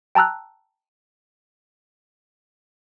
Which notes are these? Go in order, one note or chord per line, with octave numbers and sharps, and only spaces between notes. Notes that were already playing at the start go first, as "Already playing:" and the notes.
G5 A5 A#5 E6 F#6